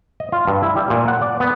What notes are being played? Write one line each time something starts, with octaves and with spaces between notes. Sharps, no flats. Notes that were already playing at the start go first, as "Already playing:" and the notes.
D#5
F4
G2
E4
G3
A#2
F#5
D5
B3